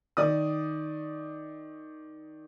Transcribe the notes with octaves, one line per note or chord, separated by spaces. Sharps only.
D#3 D5 D#6